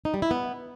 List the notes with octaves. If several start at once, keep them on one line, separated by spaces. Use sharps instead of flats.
D#4
G3
E4
B3